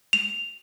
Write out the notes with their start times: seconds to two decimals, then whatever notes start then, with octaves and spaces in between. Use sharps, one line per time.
0.13 F7